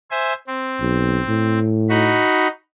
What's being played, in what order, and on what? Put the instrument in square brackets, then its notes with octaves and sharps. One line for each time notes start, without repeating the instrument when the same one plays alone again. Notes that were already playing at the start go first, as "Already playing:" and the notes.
[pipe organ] C5 E5 G#5
C4
[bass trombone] B1
A2
[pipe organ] D#4 F#4 B5